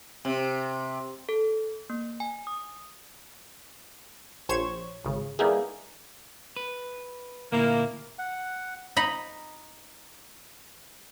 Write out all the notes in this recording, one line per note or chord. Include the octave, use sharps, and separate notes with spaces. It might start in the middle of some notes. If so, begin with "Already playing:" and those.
C3
A4
A#3
G#5
D#6
A#1 C5 C#5 G#6 E7
G#1 C#3
G3 A#3 B3 D#4 E4 G#4
B4
D2 A#2 A#3 E4
F#5
D#4 A#5 B5